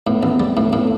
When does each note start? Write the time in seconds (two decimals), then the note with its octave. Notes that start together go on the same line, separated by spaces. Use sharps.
0.06 A2 B3
0.23 A1
0.31 C4
0.40 G3
0.56 A2 B3
0.73 A2
0.82 A3